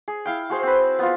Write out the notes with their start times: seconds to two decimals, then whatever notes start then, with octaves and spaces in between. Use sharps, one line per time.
0.08 G#4
0.26 E4 F5 G5
0.50 F#4 G#4 C5
0.63 C4 B4
0.99 B3 F4